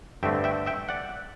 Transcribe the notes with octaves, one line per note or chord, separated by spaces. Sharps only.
G2 D3 A3 C4 E5 G5
E5 G5
E5 G5
D5 F#5